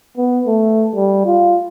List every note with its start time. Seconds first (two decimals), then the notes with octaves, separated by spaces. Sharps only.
0.17 B3
0.46 A3
0.95 G3
1.26 F4